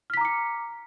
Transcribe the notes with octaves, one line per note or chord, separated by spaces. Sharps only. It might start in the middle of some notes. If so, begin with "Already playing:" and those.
A#5 D6 F6 B6 C#7